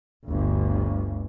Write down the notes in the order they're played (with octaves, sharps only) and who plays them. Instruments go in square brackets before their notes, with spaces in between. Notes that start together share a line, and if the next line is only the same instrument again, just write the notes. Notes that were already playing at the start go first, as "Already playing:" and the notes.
[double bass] G1 D2